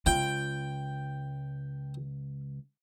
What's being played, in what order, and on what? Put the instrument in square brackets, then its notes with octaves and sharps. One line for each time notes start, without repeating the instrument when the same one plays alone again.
[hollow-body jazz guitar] C#2 [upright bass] F4 [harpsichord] G5